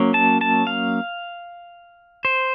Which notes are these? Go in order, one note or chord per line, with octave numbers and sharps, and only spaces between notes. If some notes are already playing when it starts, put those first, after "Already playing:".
Already playing: F#3 A#3 C#4
A5
A5
F5
C5